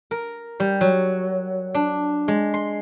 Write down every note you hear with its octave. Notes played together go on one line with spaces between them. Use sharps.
A#4
G3
F#3
D4
G#3
C6